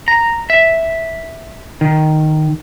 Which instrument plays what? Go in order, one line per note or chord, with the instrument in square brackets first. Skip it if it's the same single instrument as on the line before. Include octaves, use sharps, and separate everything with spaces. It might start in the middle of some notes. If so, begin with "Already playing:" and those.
[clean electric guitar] A#5
E5
D#3